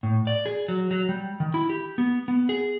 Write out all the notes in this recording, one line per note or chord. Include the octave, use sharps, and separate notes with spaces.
A2
D5
G#4
F#3
F#3
G3
D#3
E4
G4
B3
B3
G#4